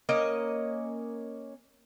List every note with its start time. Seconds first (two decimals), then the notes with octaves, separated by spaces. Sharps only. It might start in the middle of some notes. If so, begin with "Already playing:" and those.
0.09 A#3 C#4 D#5